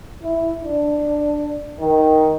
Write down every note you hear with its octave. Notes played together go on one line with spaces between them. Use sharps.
E4
D4
D#3